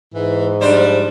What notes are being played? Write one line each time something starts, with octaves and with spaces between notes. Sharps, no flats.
G#2 E3
F3 G3 D4 C5